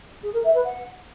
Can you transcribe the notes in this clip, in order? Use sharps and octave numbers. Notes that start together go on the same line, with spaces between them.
G#4
A#4
E5
B4
F#5